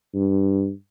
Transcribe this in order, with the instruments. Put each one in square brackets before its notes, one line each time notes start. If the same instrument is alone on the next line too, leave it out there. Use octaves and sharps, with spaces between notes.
[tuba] G2